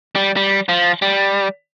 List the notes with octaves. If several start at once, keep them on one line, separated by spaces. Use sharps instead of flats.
G3
G3
F3
G3